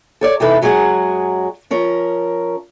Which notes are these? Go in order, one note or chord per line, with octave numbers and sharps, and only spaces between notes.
A4 C#5 D5
C3 E3 D#4 E4 A4 B4
F#2 F#3 G#3 F#4 G#4 F#5
F3 C#4 A#4